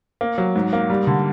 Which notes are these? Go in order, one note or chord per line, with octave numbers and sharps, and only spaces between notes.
A#3
F#3
G#2
A#3
G3
D3